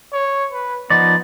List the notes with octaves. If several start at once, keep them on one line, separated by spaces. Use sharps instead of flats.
C#5
B4
F3 B3 D#4 D5